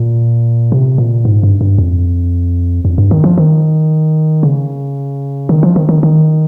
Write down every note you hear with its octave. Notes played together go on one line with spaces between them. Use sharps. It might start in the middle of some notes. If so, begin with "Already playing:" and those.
Already playing: A#2
C3
A#2
G#2
G2
G2
F2
F2
G2
D#3
F3
D#3
C#3
D#3
F3
D#3
D#3
D#3